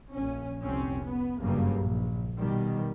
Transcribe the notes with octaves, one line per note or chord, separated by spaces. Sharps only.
A#1 C#4
F1 C2 C4 C#4
B3
F#1 G2 C#3 F#3 G3 A#3
A#1
B2 D#3 G3